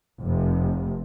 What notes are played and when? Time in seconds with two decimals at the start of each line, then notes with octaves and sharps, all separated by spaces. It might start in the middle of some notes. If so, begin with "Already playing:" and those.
0.20 F1 C3